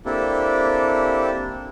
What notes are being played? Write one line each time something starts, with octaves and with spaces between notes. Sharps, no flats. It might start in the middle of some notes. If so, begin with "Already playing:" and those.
A#3 C4 D4 E4 G4 A4